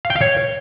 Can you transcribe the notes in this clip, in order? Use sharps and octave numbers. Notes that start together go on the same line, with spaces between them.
F5
G5
F5
C#5